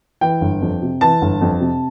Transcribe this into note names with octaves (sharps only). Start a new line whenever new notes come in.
E3 G5
G1
F2
C3
E3 A5
G1
F2
C3